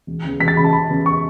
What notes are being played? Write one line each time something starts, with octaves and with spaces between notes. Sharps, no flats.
E1
E2 C#3
E1 B6
A6
E2 C#3 B5
A5
E1 B5
E2 C#3
C#6